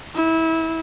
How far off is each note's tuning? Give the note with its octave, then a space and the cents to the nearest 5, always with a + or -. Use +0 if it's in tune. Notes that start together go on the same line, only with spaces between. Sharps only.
E4 -25